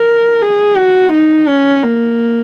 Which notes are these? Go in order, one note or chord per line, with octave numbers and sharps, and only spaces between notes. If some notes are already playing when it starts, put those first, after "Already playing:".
Already playing: A#4
G#4
F#4
D#4
C#4
A#3